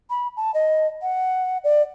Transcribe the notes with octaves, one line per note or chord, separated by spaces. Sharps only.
B5
A5
D#5
F#5
D5